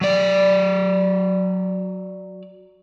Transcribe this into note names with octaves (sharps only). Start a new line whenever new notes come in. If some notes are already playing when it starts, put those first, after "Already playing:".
F#3 D5